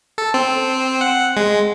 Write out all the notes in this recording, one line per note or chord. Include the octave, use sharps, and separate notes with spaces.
A4
C4
F#5
G#3